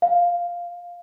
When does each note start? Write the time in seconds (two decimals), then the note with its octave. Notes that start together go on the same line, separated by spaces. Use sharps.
0.02 F5